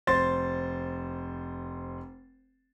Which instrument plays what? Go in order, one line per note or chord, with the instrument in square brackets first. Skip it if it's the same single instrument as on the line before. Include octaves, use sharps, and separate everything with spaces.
[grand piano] F1 C5 C6 A6